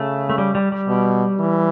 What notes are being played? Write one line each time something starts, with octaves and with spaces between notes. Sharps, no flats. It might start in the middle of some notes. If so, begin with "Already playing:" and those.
Already playing: C#3 A3
A3
G3
G3
G3
B2
E3